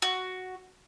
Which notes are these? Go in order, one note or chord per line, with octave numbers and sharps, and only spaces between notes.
F#4